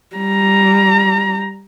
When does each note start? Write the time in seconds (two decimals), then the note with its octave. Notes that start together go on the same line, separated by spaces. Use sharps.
0.16 G3 A#5